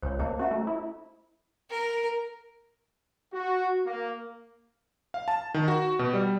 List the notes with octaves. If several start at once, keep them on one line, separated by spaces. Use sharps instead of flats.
C#2 C5 C#5
A#3 C5 D#5 A5
C#4 F#4 E5 A#5
A3
E4
A#4
F#4
A#3
F5
A5
D#3
F#4
B2
G3